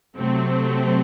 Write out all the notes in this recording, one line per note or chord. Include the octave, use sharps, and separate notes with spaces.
C3 F#3 A3 C4